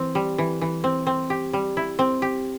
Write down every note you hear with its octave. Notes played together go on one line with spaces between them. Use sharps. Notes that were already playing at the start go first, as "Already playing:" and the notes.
Already playing: E3 C4
G3
E3
E3
C4
C4
G4
G3
E4
C4
G4